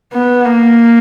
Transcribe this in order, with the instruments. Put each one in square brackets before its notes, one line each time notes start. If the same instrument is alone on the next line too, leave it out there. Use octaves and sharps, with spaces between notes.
[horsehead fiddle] B3
A#3